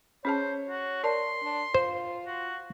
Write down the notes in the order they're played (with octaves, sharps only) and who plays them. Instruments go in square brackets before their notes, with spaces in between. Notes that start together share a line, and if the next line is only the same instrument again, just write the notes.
[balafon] C#4 G#4 A5 [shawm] C5 [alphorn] C#5
[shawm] F#4
[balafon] A#4 D5 A5 [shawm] C6
[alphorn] D4
[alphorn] F4 [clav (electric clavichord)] C5
[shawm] F#4